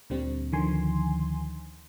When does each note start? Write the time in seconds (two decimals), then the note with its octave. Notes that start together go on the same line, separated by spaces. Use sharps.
0.10 D2 A#2 D3 G3 C4
0.52 D2 D3 D#3 F3 G#5 C6